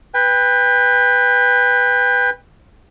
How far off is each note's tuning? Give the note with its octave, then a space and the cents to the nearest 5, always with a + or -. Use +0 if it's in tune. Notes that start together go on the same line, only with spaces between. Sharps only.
B4 +0 G5 +30